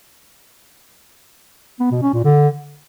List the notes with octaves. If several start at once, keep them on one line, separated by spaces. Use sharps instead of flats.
B3
B2
C#4
A#2
D3